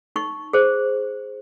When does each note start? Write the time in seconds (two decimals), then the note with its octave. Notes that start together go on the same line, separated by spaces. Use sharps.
0.16 D#4 C#6
0.53 G#4 C5